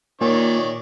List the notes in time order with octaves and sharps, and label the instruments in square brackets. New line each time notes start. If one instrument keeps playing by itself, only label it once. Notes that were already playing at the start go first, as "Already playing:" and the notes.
[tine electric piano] A#2 [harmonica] D#3 C#5 D5